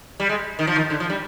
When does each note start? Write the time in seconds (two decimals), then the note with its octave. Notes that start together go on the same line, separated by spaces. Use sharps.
0.20 G3
0.29 G#3
0.59 D#3
0.67 F3
0.76 D#3
0.90 D3
1.00 F3
1.10 G3